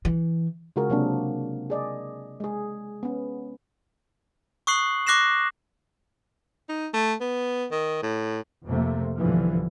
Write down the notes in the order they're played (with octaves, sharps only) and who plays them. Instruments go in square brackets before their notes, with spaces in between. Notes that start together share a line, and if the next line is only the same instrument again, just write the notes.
[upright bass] E3
[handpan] C#3 G#3 F4 F#4 G#4 A#4
C3 F#3 A#3 C4 D4
G#4 D5 D#5
G#3 G#4
B3 C#4
[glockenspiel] C#6 D#6 F#6 C7 F#7
C#6 D6 F#6 A#6 C7 E7
[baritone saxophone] D#4
A3
B3
D#3
A2
[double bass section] F2 C3 A3 A#3
B1 G2 D3 E3 F3